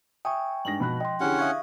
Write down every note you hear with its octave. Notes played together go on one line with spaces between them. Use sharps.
E5 G5 G#5 C#6 D#6
G2 G#3 D#4 A#6 F#7
B2 F3 B5 F#6
D#5 G5 C6
D3 C#4 E4 G4 G#4 C#5 F#5
E5 F5 C#6 D#6 F#6 G#6